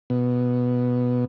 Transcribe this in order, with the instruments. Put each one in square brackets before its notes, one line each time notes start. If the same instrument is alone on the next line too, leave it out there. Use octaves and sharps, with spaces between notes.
[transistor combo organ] B2